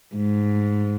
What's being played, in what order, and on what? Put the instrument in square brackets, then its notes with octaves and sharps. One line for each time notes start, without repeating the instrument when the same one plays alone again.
[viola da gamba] G#2